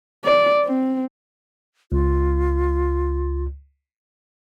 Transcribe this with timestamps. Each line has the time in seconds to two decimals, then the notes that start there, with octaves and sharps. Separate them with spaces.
0.24 D5
0.65 C4
1.92 C#2 F4